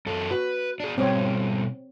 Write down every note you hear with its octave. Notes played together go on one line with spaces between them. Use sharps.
F#2 A4
F#4 B4
D4 G#4
B2 G3 C4 C#5